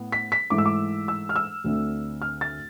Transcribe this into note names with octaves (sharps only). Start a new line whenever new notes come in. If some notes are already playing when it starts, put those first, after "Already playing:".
Already playing: A2 B3
B6
B6
G#2 E3 A3 D6
E6
D6
E6
F6
E6
D2 D3 A3 C4
F6
A6